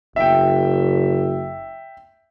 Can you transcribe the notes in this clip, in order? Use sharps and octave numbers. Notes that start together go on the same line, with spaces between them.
F#1 E5 G5